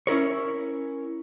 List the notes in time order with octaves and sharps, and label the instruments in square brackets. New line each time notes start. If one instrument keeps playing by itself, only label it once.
[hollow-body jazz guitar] C#4 E4 A#4 C#5